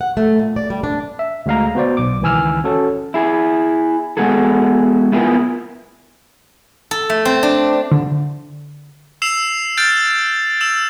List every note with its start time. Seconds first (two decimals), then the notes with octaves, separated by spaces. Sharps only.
0.01 F#5
0.17 A3
0.39 A#2
0.56 D5
0.70 G3
0.84 D4
1.19 E5
1.46 D2 G#3 F5 A#5
1.75 B3 F#4 C5 D5
1.97 B1 D6
2.21 C#2 D#3 E3 G#5 E6 F6
2.64 C#4 F#4 A4 C#5
3.14 E4 G#4
4.17 G#3 B3 F#4 G#4 A4
5.12 B3 E4 F4 G#4 A#4 B4
6.91 A4
7.10 A3
7.25 C4
7.43 D4
7.92 D3
9.22 E6 C7 E7 F7
9.77 F6 G6 A6 D7
10.61 E6 E7 F7